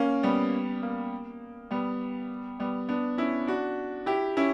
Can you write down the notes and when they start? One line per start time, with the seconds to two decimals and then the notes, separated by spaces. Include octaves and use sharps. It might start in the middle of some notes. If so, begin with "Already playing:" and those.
Already playing: A#3 C#4
0.23 G3 B3
0.83 A#3
1.71 G3 B3
2.60 G3 B3
2.89 B3 D4
3.18 C#4 E4
3.47 D4 F#4
4.06 E4 G4
4.37 C#4 E4